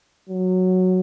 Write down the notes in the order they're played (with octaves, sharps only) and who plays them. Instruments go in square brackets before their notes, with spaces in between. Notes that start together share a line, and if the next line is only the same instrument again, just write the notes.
[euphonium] F#3